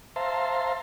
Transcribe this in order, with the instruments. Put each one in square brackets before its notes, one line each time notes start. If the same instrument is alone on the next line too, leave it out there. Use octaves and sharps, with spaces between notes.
[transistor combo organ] C5 E5 F5 A5 A#5 C6